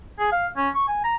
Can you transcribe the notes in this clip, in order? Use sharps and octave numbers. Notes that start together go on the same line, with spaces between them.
G#4
F5
C#4
C#6
G#5
A#5